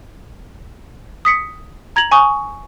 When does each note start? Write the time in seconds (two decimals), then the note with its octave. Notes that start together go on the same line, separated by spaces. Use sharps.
1.25 D#6 B6 C#7
1.96 A#5 G#6 A#6 F7 F#7
2.11 G#5 C#6 D#6